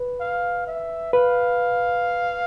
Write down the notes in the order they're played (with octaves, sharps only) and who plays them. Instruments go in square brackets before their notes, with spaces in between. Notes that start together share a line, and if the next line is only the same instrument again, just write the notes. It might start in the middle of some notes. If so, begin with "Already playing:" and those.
Already playing: [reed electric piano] B4
[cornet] F5
E5
[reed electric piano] B4 [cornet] F5